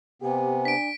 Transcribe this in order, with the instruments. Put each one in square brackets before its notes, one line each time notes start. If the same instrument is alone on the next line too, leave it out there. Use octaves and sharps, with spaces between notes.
[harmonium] C3 B3 [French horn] G4 [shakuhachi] G#5
[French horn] D4 [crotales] B6 D7